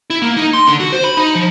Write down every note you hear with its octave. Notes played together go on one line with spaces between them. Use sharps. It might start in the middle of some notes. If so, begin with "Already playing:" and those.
E4
A#3
D#4
C6
D3
F#4
C5
B5
D#4
F3